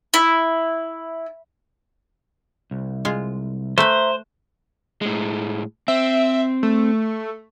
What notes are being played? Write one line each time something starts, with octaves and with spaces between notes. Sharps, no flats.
E4
C2
G#3 F4
A3 B4 C5 E5 A#5
A2 G#3
C4 E5
A3